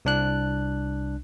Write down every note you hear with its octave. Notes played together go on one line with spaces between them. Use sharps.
C2 D4 F#6